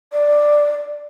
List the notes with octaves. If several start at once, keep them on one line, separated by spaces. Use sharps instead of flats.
D5